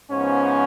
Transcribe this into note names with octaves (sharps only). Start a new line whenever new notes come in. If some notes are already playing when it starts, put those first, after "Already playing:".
G#2 F3 B3 C#4